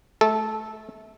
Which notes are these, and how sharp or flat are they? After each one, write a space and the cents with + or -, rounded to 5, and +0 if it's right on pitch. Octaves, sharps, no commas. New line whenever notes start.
A3 -25 A4 -10